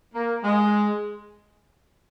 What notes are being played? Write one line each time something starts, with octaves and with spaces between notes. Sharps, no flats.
A#3
G#3